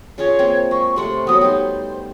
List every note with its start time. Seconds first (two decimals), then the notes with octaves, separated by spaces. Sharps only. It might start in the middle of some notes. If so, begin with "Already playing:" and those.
0.18 C#3 F4 G#4 C#5
0.39 A#3 C4
0.71 G#3 C#6
0.96 C3 A3 F#5 C6
1.27 F#3 B3 D#6
1.41 G3 D#4 C5